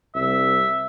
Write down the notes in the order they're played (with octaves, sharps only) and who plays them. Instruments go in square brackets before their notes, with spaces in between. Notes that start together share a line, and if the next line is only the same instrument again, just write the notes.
[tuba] C2 [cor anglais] E5